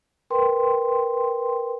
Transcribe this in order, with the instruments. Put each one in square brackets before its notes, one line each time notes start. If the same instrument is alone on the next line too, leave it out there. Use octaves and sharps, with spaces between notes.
[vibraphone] A#4 B4 G5 C6